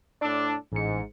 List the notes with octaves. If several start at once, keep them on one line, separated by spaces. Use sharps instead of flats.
A2 D4 D5 D6 E6
A1 G#2 C#7